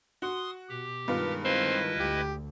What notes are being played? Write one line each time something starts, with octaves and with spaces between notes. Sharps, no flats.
F#4 C6 D#6
B2 G4
G2 D#3 G#3 B3 F4
C4 E4 B4 D#5
D2 G4